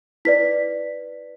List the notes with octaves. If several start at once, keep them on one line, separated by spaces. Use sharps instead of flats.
E4 B4 D5 B6